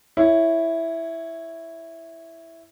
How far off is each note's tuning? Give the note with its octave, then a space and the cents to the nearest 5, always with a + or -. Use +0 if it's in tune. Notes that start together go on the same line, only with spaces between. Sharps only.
E4 +0 C#5 +0